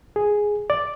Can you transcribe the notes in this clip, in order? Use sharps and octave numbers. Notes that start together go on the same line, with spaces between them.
G#4
D5